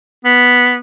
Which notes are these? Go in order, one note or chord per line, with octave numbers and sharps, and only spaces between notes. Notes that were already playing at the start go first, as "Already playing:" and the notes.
B3